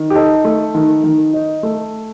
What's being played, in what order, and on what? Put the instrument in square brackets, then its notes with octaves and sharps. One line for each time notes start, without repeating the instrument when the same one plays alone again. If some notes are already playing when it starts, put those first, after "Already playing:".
Already playing: [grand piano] D#3
G4
D#4 A4
A3
D#3
D#3
D#4
A3